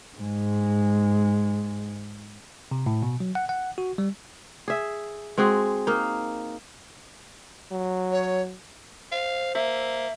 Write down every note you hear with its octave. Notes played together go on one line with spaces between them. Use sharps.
G#2 G#3
C3
A2
B2
F#3
F#5
F#5
F#4
G3
G#4 E5
G#3 C4 F#4 G#4
A#3 D#4
F#3
C#5
C5 F5
A#3 E5